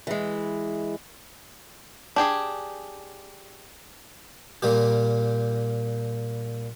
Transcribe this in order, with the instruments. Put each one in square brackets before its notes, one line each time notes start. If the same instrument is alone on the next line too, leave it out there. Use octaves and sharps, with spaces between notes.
[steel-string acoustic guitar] E3 G#3
[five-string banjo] D4 G4 G#4
[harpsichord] A#2 G3 G4